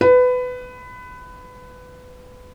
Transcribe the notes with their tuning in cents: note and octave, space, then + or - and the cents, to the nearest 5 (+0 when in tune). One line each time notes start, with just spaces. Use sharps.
B4 +20